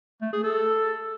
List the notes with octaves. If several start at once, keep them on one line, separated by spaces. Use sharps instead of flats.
A3
G#4
A4